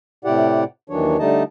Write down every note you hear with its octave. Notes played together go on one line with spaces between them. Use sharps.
A2 C3 E4 G4 D5 F#5
D#2 D#3 E3 F#3 D4 C#5
D3 G3 A3 D#4 D#5 A5